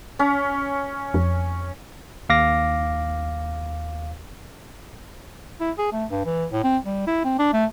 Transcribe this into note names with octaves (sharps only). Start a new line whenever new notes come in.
C#4
F2
D#2 F5 D6 A#6
E4
G#4
A3
G2
E3
A2
C4
G3
E4
C4
D4
A3